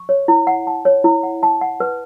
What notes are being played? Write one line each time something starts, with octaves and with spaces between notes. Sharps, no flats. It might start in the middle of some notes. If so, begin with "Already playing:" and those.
Already playing: C#6
C#5
E4
F#5
A5
C#5
E4
F#5
A5
F#5
B4